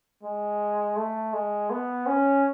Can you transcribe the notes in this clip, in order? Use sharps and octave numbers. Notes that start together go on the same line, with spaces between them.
G#3
A3
G#3
B3
C#4